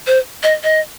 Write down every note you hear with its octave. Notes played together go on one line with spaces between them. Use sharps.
C5
D#5
D#5